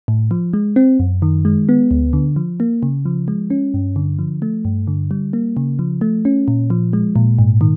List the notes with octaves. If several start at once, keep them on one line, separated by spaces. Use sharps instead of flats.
A2
F3
G#3
C4
F#2
D#3
G#3
B3
D2
D3
F3
A#3
C#3
F3
G#3
C#4
G2
D3
F3
A3
G2
D3
G3
A#3
C#3
F3
A3
C#4
A#2
F3
G#3
A#2
G#2
D#3